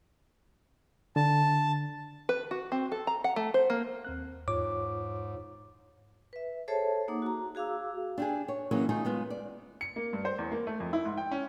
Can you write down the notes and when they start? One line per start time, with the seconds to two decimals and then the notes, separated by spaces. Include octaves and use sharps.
1.16 D3 A5
2.29 B4
2.51 F#4
2.72 C4
2.92 A4
3.07 A#5
3.24 F#5
3.36 A3
3.54 C5
3.70 A#3
4.05 D#2 C4 F#6
4.48 E2 G#2 F4 C#5 D6
6.33 B4 E5
6.68 G#4 A4 C5 C#5 E5 A5
7.08 A#3 D#4 F#5 D6
7.22 F#4 A#5
7.55 F#4 G#4 F5 D6 E6
8.18 D4 G4 G#4
8.48 C#5
8.71 E3 F#3 A#3 C#4 G#4
8.89 A3 D#4 F4 G#4
9.05 G#3 B3 F4
9.30 D5
9.81 C#7
9.96 A#3
10.13 G2
10.25 C5
10.39 E2
10.52 A#3
10.67 A3
10.80 F2
10.93 E4
11.05 G#2
11.17 G5
11.31 C#4